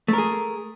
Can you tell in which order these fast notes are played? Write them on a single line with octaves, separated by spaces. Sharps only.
A3 A#4 G#4